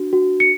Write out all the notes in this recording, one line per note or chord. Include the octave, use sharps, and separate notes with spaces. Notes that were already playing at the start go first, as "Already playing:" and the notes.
Already playing: D4 F#4
F#4
C#7